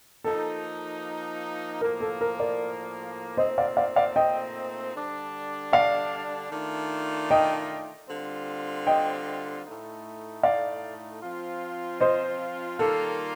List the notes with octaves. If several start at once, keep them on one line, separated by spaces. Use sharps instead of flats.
F3 A#3 D#4 A4
A2 F3 A#3 A#4
A4
A#4
A#4 D5
A#2 A3 C4 D#4 C5 D#5
D5 F5
D5 F5
D5 F5
D#5 G5
D3 G3 D4
D5 F5
D#3 A3 D4 F4
D#5 G5
D3 G3 C4 F4
D#5 G5
A2 A3 D#4
D5 F5
F3 C4 F4
C5 D#5
D#3 G3 A#3 F4 A4